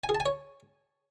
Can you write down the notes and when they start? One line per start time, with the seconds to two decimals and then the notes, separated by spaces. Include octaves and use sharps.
0.04 G#5
0.09 G#4
0.15 A5
0.20 G#5
0.26 C#5